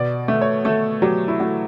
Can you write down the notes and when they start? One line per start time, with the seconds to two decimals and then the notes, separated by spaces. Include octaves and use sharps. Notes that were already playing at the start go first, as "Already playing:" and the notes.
Already playing: B2 D5
0.28 A3
0.42 C#5
0.65 A3 A4
1.02 F#3 G4
1.28 E4
1.40 A3 F#4